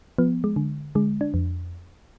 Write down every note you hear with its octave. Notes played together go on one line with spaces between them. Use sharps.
F3 B3
G#3
D3
D3 G#3
D4
F2